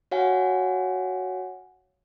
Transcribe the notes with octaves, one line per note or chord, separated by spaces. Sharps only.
F#4 C#5 F5 F#5 G#5